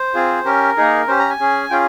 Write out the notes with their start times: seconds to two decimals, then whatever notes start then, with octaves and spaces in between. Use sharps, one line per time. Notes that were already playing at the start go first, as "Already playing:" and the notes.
Already playing: C5
0.14 C4 F4 G#4
0.45 C#4 G4 A#4
0.77 A#3 D#4 G#4
1.08 C#4 G4 C5
1.19 A#5
1.29 G#5
1.40 C#4 G#4
1.70 C#4 F4 G#4 G5